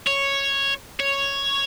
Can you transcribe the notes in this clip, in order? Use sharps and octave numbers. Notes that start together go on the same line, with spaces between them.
C#5
C#5